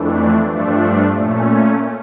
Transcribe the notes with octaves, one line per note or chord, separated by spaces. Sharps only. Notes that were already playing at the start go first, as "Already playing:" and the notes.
Already playing: F2 E3 A3 D4
G2 F3 A3 D4
A#2 A3 C#4